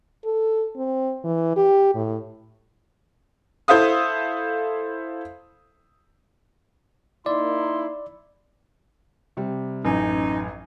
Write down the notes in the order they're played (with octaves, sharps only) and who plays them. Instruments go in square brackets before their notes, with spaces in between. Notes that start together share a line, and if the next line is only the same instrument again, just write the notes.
[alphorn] A4
C4
E3
G4
A2
[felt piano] E4 A4 C5 E5 F5 D#6
[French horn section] A#3 D#4 [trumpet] E4 [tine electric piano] D5 [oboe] C6
[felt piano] C3 G3
[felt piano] A1 F#2 G#5 [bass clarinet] D#4